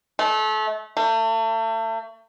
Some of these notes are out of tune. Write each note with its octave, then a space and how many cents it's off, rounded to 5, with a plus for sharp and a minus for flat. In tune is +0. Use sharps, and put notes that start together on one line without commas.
A3 -30
A3 +35